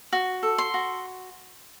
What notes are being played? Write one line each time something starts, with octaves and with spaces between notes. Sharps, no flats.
F#4
A4
C6
F#4